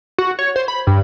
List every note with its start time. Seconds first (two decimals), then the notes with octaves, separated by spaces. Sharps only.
0.18 F#4
0.39 C#5
0.56 C5
0.68 B5
0.87 G2